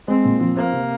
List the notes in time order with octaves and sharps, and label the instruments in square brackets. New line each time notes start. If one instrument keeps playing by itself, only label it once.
[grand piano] G#3 [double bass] C4
[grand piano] A#2
F3
[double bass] A#3 [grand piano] C4
[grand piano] C3